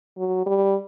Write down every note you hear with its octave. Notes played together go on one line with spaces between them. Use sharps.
F#3
G3